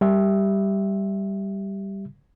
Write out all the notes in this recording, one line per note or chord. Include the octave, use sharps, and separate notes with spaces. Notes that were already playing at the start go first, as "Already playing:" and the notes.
G3 G4 E5